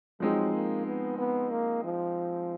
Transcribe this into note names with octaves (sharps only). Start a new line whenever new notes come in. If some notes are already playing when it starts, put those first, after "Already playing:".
F3 F#3 G#3 C4 D#4 G#4
A#3
B3
B3
A#3
F3